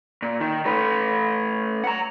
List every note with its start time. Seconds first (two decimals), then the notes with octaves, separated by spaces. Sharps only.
0.22 A#2
0.40 D#3
0.66 A3 B4
1.84 F#5 A#5